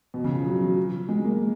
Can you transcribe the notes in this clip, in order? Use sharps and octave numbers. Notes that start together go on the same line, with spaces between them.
B2
C#3
F3
F#3
F#3
G#3
A#3